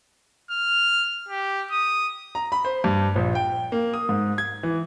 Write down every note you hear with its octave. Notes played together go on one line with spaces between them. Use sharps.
F6
G4
D#6
A#5
B5
C5
G2
A#1
G5
A#3
D#6
G#2
G#6
E3